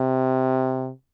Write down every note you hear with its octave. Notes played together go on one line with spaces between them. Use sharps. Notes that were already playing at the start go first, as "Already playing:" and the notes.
Already playing: C3